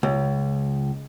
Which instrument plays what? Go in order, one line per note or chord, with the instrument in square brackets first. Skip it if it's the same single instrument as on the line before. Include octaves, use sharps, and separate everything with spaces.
[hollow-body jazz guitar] C#2